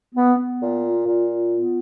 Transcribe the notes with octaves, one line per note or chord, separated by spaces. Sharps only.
B3
B3
A#2
F4
A#2
F4
B3